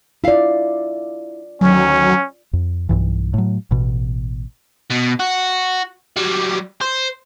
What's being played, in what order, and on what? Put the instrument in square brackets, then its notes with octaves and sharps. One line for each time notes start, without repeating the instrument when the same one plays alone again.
[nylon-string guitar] E4 F5 [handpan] F4 D5
[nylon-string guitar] D2 D#3 [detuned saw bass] F#3 [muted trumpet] C#4
[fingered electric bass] F2
B1 G2 E3
A2 F#3
A1 B2
[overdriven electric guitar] B2
F#4
F#3 G3
C5